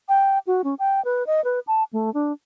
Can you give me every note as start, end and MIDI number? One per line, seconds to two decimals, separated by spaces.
0.09 0.38 79
0.47 0.62 66
0.64 0.75 61
0.79 1.03 79
1.05 1.26 71
1.27 1.43 75
1.44 1.59 71
1.67 1.83 81
1.93 2.12 57
2.14 2.32 62